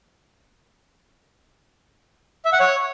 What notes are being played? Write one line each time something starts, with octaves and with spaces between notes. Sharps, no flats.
E5
F#5
C#5